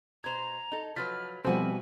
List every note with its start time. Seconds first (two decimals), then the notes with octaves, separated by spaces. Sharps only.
0.24 B2 C5 A#5 G#6
0.72 D#4 A4
0.96 F3 F#3 B4 F6 A6 B6
1.45 B2 F3 G3 C4 E4 F#4 A4 G#5